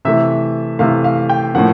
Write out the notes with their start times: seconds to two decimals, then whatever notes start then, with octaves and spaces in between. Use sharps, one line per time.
0.05 C3 E3 A3 E5
0.79 C3 E3 A3 F5
1.04 F5
1.29 G5
1.54 A2 F3 A#3 F#5